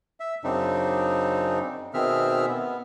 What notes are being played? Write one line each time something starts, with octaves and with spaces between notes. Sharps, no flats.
E5
F#2 C#3 C4 D4 D#4
B2 D#3 C4 G#4 E5 F6
B3